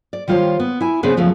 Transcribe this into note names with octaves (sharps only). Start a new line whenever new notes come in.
D5
D#3 G3 F4 C5 C#5
B3
E4 G#5
C#3 B3 C4 D4 G#4 B4
F#2 C#3 F3 A3 B3